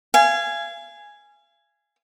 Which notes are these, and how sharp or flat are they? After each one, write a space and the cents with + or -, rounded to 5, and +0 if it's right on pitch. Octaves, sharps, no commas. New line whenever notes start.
F5 -35 G#5 +0